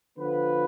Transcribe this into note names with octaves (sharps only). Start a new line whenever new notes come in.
D3 F3 B3 F4 B4